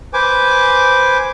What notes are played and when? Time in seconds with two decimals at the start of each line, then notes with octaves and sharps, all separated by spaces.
0.14 B4 C5 G#5 D6